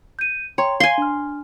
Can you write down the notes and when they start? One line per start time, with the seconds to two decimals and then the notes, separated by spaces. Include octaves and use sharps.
0.19 G6 D#7
0.58 C#5 G5 A#5 C6
0.80 F5 G#5 C6
0.98 D4 F6